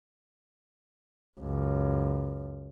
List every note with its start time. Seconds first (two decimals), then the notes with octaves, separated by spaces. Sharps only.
1.40 C#2 F#2